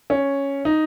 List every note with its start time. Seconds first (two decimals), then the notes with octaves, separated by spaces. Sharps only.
0.10 C#4
0.65 D#4